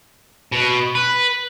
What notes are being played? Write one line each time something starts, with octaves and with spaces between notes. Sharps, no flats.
B2
B4